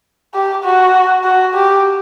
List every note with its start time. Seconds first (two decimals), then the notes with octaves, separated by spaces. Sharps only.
0.34 G4
0.64 F#4
1.24 F#4
1.55 G4